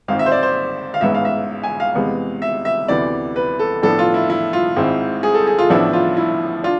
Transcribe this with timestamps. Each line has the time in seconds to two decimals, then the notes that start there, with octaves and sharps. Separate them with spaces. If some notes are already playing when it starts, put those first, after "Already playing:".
0.08 G#1 G#2 G#3 C4 F5
0.19 E5
0.26 C5
0.32 D5
0.43 C5
0.94 F5
1.01 A1 G#2 G#3 B3 E5
1.14 F5
1.25 E5
1.63 G#5
1.80 F5
1.95 E2 C3 G#3 B3
2.42 E5
2.65 E5
2.88 D2 C3 E3 B3 D5
3.36 B4
3.59 A4
3.83 A2 F3 B3 D4 A4
3.99 F4
4.14 E4
4.30 E4
4.53 F4
4.76 G#1 G#2 G#3 C4 E4
5.23 G#4
5.34 A4
5.47 G#4
5.59 F4
5.70 A1 A2 F3 B3 D4 E4
5.93 F4
6.17 E4
6.63 D4 F4